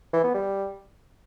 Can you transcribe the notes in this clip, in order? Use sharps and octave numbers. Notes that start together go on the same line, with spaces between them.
E3
B3
G3